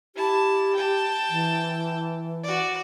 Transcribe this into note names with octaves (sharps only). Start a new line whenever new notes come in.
E4 G4 A5
G5 A5
E3
F#4 D5